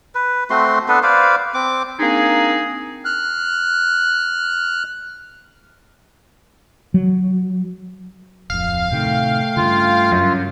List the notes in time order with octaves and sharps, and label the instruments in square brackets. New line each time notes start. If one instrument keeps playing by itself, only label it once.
[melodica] B4
A3 C4 F#4 C6
B3 D4 A4 B4
B4 C5 D5 F5
C4 D6
[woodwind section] A#3 C4 D4 D#4 G#4
[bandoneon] F6 F#6
[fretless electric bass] F#3
[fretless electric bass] D1 F2 [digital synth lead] F5
[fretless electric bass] A2 C3 D#3 [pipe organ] A3 G5
[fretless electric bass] G2 C#3 [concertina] F4
[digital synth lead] F#2